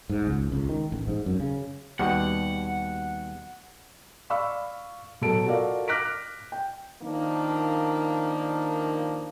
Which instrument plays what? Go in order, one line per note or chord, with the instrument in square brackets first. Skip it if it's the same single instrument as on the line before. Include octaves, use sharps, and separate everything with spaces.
[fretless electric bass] G#2
C#2
C#2
D#3
A1
G#2
F#2
C#3
[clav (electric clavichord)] D#2 B2 G3 [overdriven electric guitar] F#5
[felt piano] D5 F5 B5 C#6 E6
B2 F#3 A4 D7
F4 F#4 A4 A#4 D5 F5
D6 F6 F#6 A#6 B6 D7
G5
[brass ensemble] D#3 F3 A#3 D4